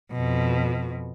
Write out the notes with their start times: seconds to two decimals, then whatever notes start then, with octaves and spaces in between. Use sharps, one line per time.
0.12 F2 B2